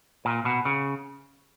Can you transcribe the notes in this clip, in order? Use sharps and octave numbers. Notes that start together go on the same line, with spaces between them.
A#2
B2
C#3